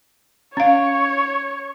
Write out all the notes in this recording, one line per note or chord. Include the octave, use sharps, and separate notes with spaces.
C#4 C#5 F5